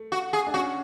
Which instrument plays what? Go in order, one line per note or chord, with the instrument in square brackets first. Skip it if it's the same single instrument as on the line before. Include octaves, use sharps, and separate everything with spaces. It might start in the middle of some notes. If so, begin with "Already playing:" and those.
Already playing: [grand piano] A3
[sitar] F#4
G#4
[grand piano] D4
[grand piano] C#4 [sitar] F#4